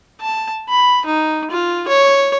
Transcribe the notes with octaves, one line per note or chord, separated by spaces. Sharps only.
A5
B5
D#4
F4
C#5